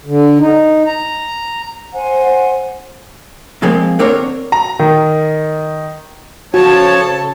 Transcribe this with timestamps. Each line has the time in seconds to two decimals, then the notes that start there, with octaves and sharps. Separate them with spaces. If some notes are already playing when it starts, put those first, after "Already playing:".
0.05 D3
0.39 D#4
0.86 A#5
1.94 C5 F#5 G#5
3.62 A#2 F3 G#3 A#3 C4
3.99 D3 C4 D4 A#4 C5 C#5
4.52 A#5
4.79 D#3
6.54 C#3 F3 F#4 A4 C#5 A5